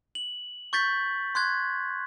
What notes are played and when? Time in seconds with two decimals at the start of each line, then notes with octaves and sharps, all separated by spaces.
0.15 F#7
0.73 C#6 G6 A6 B6
1.35 C6 F#6 G#6